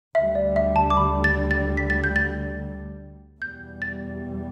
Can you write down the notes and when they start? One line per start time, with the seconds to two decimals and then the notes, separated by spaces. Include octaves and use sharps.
0.15 D2 D3 G3 E5
0.35 D5
0.56 E5
0.76 A5
0.90 D6
0.97 B5
1.24 A6
1.51 A6
1.77 B6
1.90 A6
2.04 G6
2.16 A6
3.41 E2 B2 G3 G6
3.82 A6